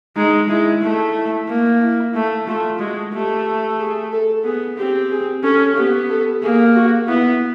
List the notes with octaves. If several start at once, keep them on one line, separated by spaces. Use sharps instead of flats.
G#3 D#4
G#3 E4
A3
E4
A#3
E4
A3
A3 F4
G#3 F#4
A3 G4
G#4
A4
B3 G#4
C4 G4
G#4
C#4 A4
B3 G4
A4
A#3 G#4
F#4
B3 E4